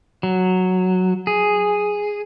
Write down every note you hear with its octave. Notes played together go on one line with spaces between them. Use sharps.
F#3
G#4